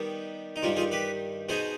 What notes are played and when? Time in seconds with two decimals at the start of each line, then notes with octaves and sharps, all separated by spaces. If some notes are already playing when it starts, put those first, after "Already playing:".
Already playing: D#3 G3 B3
0.56 D#4
0.62 G2 D#3 G3 F4
0.76 F4 G#4
0.91 G4 B4
1.49 B2 B3 D#4 G#4 C5